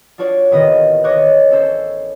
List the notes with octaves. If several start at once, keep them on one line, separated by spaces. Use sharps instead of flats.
D4 F4 F#4 C#5 D5
A1 C3 D#3 B3 D#5
C#5 D#5 C#6 D6 F#6
C#4 A4 C5